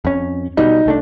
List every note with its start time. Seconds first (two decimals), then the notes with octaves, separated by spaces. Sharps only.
0.05 F2 C#4
0.57 B2 G3 D#4
0.86 C2 A3 D4